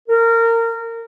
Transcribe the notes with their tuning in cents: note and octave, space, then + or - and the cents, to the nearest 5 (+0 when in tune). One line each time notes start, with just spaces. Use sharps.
A#4 -25